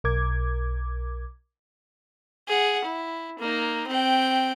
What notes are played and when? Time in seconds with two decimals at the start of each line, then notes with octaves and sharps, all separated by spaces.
0.04 B1 A#4 D6 G#6
2.48 G#4 F#5
2.84 E4
3.39 A#3 D#4
3.88 C4 G5